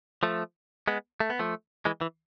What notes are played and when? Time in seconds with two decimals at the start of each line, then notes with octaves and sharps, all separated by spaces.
0.23 F3 A3
0.88 G#3 B3
1.20 A3
1.30 B3
1.39 F3 A3
1.85 E3 G#3
2.01 E3